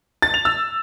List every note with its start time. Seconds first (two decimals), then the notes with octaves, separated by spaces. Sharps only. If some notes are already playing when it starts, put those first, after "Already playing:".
0.22 A6
0.34 F7
0.45 E6